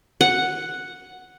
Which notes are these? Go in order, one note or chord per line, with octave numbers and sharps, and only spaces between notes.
F#5